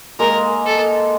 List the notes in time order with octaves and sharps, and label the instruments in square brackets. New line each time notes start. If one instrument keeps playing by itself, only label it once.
[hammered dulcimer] G#3 A#3 [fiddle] A#4
[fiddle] A4